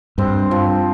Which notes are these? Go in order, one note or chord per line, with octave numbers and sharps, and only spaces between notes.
G2 C4
F3